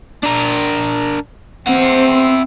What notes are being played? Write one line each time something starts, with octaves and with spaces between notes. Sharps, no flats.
D4 A#4
C4 E4 F#5